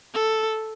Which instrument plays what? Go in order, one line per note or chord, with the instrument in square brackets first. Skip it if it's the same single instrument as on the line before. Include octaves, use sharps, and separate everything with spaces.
[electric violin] A4